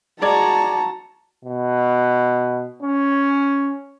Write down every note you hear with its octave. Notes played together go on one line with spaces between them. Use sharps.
G#3 F#4 D5 A5 A#5 G#6
B2
C#4